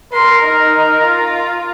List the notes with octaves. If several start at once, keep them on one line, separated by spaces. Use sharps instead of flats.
A#4 C6
D#4
F4